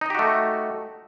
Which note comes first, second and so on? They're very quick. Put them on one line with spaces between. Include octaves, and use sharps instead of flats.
D#4 D#5 G4 F#4 A3